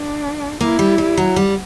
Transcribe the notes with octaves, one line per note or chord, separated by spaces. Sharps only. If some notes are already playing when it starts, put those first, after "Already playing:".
Already playing: D4
A#3 E4
G3
G3
F#3
G3